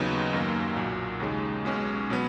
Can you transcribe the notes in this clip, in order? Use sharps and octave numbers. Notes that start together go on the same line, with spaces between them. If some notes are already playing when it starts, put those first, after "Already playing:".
Already playing: D#2 C#3 F#3 B3 D#4
F#2 D#3 F#3 A#3
B1 A#2 F#3
D#2 C#3 G#3 D#4
B1 B2 G#3 C#4
B2 F#3 B3